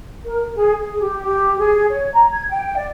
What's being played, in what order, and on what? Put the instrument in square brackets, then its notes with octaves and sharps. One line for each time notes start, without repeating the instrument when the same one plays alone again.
[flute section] A#4
G#4
G#4
G4
G4
G#4
C#5
A#5
G#6
G5
D5